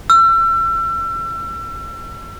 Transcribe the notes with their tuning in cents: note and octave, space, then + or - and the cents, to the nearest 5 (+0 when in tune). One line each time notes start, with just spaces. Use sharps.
E6 +35